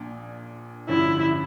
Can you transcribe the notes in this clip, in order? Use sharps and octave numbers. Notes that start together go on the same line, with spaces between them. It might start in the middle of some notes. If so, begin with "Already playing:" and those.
Already playing: A#1 A#2 D4
A1 G2 D3 F3 C#4 E4